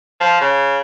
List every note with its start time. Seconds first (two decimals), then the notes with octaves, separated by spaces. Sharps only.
0.20 F3
0.41 C#3